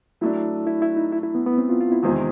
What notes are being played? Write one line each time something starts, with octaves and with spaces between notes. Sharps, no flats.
F#3 A3 D4 E4
E4
E4
D#4
E4
E4
B3
B3
C4
F4
F4
E4
E2 C3 D#3 G#3 C4 F4